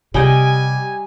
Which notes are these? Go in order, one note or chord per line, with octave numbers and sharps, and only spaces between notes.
C3 G3 G4 D#5 G5 G#5